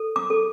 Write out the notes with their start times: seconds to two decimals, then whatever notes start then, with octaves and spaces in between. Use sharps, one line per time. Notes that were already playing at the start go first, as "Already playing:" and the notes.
Already playing: A4
0.16 D6
0.30 A4